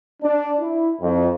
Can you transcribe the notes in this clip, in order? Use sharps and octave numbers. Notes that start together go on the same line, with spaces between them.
D4
E4
F2